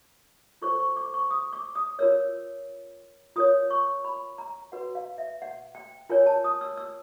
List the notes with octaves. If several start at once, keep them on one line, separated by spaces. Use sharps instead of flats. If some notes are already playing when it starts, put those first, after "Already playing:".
F4 A4 C5 C#6
C#6
D6
C#6
D#6
D6
D#6
F4 A#4 C#5 E6
F4 A#4 C#5 D#6
C#6
B5
A#5
F#4 B4 F#5
F5
E5
F#5
G5
F4 A#4 C#5 G#5
A5
D#6
E6
E6